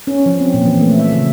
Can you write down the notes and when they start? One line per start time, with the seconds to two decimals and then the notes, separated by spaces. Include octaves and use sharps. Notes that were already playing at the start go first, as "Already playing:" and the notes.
0.07 C#4
0.26 F3
0.40 C4
0.54 A#2
0.66 E3
0.81 A3
0.99 E5
1.12 C#3